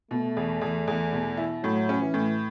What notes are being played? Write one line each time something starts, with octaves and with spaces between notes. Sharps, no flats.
B2 A3
E2
E2
E2
B2
E4
A2 F#3
C#4
E3
A2